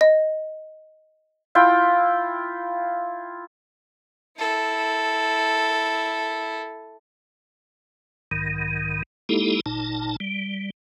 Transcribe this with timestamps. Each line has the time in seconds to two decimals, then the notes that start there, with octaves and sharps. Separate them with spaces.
0.01 D#5
1.55 E4 F4 G5
4.37 E4 A4
8.31 B1 G#2 D#3
9.29 G#3 A#3 D#4 E4 G4 A4
9.66 G1 A#2 D#4 A5
10.20 G3